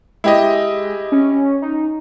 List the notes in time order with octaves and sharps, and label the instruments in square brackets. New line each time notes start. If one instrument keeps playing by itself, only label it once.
[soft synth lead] G#3 [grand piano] E4 G4 D#5
[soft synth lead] C#4
D#4